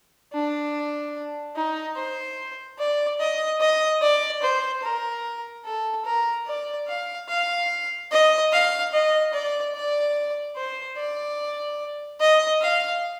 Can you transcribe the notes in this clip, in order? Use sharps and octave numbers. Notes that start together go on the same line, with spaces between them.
D4
D#4
C5
D5
D#5
D#5
D5
C5
A#4
A4
A#4
D5
F5
F5
D#5
F5
D#5
D5
D5
C5
D5
D#5
F5